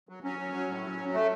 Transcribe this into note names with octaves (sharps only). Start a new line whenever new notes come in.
F#3
F#3 C#4
F#3
F#3
A2
F#3
F#3
A3